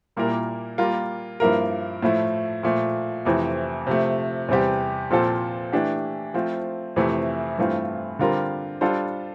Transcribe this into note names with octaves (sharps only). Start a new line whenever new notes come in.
A#2 G3 A#3 E4 A#4
G3 A#3 F4 A#4
G2 F3 A#3 E4 A#4
A2 F3 A3 E4
A#2 F3 A3
F2 C3 E3 A3 C4
C3 F3 A3
E2 C3 G3 C4 G4
A#2 F3 C4 F4 A4
E3 A3 D4 G4
F3 A3 C4 F4
F2 C3 E3 A3 E4
G2 E3 A3 C4 F4
D3 G3 C4 F4 A#4
G3 D4 F4 A4 C5